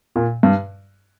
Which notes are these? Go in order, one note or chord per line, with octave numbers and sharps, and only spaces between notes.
A#2
G2